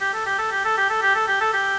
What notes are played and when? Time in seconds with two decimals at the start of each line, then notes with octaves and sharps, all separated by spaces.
0.01 G4
0.14 A4
0.26 G4
0.38 A4
0.51 G4
0.65 A4
0.77 G4
0.90 A4
1.02 G4
1.15 A4
1.28 G4
1.41 A4
1.53 G4